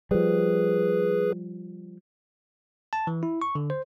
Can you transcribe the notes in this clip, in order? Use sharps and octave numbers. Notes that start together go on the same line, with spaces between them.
F3 G3 G#4 B4
A5
E3
E4
C#6
D3
C5